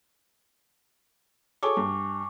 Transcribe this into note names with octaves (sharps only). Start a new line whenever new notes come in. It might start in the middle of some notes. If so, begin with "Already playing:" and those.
G#4 A4 C#5 G#5 C#6 D6
G2